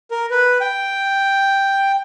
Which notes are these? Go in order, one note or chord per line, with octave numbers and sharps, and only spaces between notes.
A#4
B4
G5